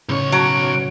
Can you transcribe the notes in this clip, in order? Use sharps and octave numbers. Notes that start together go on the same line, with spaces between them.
B1 A2 C#3 C#4 C#5
F#3 D7